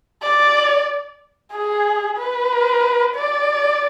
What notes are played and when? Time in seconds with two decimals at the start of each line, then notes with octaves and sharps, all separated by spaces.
0.23 D5
1.52 G#4
2.17 B4
3.15 D5